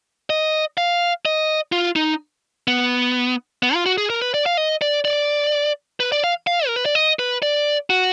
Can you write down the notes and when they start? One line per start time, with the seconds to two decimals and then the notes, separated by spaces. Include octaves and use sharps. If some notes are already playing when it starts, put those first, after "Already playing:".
0.30 D#5
0.78 F5
1.25 D#5
1.72 F4
1.96 D#4
2.68 B3
3.63 B3
3.74 F4
3.86 F#4
3.98 G#4
4.10 A#4
4.22 B4
4.34 D5
4.46 F5
4.57 D#5
4.82 D5
5.05 D5
6.00 B4
6.12 D5
6.24 F5
6.47 F5
6.67 A#4
6.76 B4
6.86 D5
6.95 D#5
7.19 B4
7.42 D5
7.90 F#4